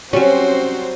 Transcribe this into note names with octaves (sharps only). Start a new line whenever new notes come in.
F#3 G3 C4 C#4 F#4 C5